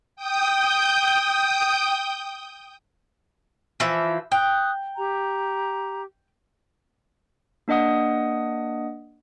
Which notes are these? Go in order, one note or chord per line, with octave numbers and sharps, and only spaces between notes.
G5 D#6 G6
E3 F3 E5
G5 D#6 F#6
G4 A#5
A#3 D4 D#5 F#5 D#6